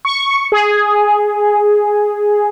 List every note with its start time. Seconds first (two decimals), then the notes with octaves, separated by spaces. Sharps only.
0.05 C#6
0.52 G#4